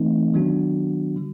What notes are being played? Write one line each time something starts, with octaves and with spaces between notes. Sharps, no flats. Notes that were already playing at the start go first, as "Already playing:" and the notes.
Already playing: E3 A3 C4 D#4
D#3 F#3 B3 D4 F#4
D3 G3